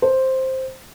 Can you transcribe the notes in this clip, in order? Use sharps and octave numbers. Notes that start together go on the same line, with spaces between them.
C5